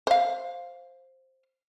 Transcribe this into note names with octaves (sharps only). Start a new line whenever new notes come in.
C5 F5